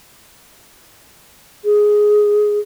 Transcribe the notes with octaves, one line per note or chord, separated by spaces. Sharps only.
G#4